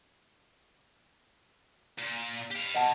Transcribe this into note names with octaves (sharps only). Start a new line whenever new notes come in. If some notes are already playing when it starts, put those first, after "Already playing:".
A#2
G4 F5
D#2 B2 D#5 F#5 A5